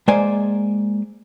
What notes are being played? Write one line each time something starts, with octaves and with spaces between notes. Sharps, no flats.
G#3 A#3 C5 D5 G#5